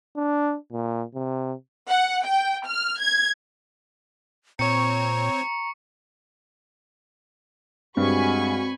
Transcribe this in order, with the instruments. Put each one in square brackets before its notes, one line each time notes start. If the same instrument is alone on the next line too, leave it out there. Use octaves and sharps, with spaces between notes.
[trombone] D4
A#2
C3
[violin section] F#5
G5
F6
G#6
[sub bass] A#2 [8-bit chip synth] C4 C#5 [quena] A#5 [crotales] C#6 C#7
[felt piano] G2 [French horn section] G#3 F#4 [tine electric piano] C4 [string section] G#5 B5 C#6